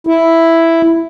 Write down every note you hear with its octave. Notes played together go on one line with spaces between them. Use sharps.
E4